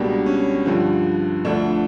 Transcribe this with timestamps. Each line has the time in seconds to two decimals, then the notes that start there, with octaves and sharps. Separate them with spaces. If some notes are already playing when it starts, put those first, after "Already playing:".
Already playing: C#2 B2 G3 A#3 D4
0.26 C#4
0.66 G2 D3 F3
1.45 D2 D3 F3 A3 D4